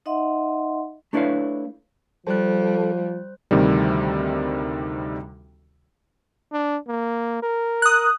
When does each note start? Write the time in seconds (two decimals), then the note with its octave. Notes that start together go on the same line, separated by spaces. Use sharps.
0.06 D#4 D#5 E5 F#5 C6
1.13 A3 D4 E4 B4 C#5 F5
2.27 F3 G3 A4 C5 F#6
3.51 D2 C3 D#3 G3
6.52 D4
6.88 A#3
7.43 A#4
7.82 D#6 F#6